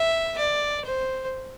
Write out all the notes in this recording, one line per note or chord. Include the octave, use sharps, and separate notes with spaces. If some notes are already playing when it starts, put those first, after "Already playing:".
Already playing: E5
D5
C5